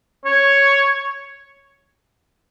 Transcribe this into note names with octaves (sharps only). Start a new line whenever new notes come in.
C#5